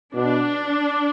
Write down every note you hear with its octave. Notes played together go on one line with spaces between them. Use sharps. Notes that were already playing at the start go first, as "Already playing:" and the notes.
B2 D4